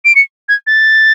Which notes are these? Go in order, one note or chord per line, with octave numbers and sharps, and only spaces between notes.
D7
C#7
G#6
A6